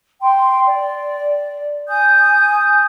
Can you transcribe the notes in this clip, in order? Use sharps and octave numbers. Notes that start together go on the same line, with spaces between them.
G5 C6
D5
G#5 D#6 G6